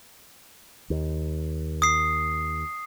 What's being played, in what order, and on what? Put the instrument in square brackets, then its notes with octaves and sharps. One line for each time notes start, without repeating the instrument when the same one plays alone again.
[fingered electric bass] D#2
[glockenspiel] D#6 C7